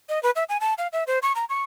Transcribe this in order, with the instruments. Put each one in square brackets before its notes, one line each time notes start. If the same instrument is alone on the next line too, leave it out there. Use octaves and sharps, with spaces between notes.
[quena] D#5
B4
E5
G#5
A5
F5
E5
C5
C#6
A#5
C#6